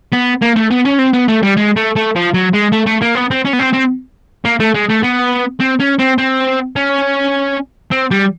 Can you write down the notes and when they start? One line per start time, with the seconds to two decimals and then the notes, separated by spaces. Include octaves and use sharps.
0.13 B3
0.42 A#3
0.56 A3
0.71 B3
0.85 C#4
0.99 C4
1.14 B3
1.28 A3
1.43 G3
1.57 G#3
1.76 A3
1.96 A3
2.15 F3
2.34 F#3
2.54 G#3
2.73 A3
2.87 A3
3.02 A#3
3.15 B3
3.31 C4
3.45 C#4
3.53 B3
3.59 C4
3.73 C4
4.45 A#3
4.60 A3
4.74 G#3
4.89 A3
5.03 B3
5.60 C4
5.80 C#4
5.99 C4
6.18 C4
6.76 C#4
7.91 C4
8.11 G3